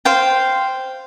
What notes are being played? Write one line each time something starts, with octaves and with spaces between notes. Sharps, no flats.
C5 F5 G5